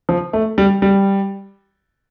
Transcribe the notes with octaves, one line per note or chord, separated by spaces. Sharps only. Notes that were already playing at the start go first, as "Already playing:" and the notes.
F3
A3
G3
G3